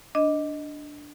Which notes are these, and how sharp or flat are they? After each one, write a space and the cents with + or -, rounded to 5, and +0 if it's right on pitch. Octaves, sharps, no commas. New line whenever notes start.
D4 +0 D#5 +0